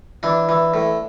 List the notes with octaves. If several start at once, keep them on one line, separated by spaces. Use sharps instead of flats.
E3 D4
E3
A2